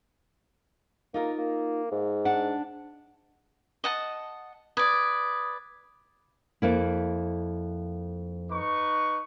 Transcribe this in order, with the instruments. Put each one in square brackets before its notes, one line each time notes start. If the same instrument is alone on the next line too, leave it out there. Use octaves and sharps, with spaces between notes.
[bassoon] A#3 [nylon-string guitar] D#4 F4 A#4
[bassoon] A#3
G#2
[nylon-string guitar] D4 F#5
[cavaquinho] D#5 F#5 A5
[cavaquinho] B4 D5 [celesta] D#6 G#6
[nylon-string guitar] F2 A#3 E4
[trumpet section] D#4 B4 C#6